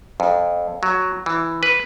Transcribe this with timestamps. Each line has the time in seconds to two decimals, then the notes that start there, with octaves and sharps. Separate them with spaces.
0.20 F2
0.83 F#3
1.26 E3
1.63 B4